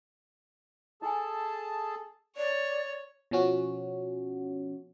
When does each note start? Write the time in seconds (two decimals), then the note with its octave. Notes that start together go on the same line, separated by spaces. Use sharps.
1.02 E4 G#4 A4 G#5 A5
2.37 C#5 D5
3.31 B2 F3 C#4 F#4